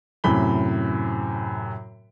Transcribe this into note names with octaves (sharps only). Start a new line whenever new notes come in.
F#2 A2 C3 B5 G7